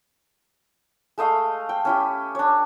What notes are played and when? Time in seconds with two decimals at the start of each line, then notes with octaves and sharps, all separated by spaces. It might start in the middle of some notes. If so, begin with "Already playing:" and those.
1.18 G#3 A3 D#5 F5
1.69 G5
1.85 C#4 E4 G4
2.35 D4 C#5